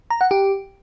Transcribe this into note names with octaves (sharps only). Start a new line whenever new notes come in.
A#5
F#5
G4